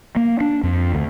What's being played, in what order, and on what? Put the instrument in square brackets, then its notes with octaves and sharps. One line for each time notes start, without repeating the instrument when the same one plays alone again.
[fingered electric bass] A#3
D4
F2
D2